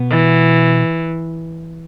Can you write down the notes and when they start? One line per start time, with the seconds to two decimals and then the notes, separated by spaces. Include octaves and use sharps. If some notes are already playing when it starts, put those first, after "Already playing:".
Already playing: B2 B3
0.10 E3